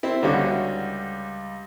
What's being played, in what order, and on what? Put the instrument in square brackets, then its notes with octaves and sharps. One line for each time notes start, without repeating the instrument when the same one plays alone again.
[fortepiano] C4 E4
[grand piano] C#2 G3 [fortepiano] D3 C#4 F#4